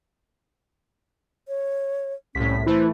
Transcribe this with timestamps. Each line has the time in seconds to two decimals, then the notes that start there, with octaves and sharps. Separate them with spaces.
1.48 C#5
2.35 C2 A2 C#4 B6
2.66 E3 A3 E4 C5